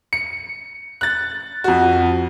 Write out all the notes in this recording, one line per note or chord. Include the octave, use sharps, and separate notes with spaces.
C#7
F#6 A6
F2 F#4